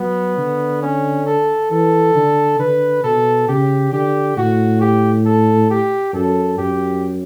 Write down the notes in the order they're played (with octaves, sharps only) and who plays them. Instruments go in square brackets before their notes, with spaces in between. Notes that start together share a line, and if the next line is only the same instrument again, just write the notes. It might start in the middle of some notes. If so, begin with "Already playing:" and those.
Already playing: [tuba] F#3 [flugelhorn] B3
[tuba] D3
[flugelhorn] C#4
A4
[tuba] E3 [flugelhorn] A4
[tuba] D3
[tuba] D3 [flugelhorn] B4
[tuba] B2 [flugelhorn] A4
[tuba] C#3 [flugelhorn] G4
[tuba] D3 [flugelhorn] G4
[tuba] A2 [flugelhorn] F#4
[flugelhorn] G4
A4
G4
[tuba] F#2 [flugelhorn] A4
[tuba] F#2 [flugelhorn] G4